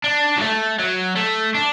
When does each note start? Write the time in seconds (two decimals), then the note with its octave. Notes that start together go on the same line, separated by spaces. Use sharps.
0.04 D4
0.37 F#3
0.41 A3
0.79 F#3
1.16 A3
1.55 D4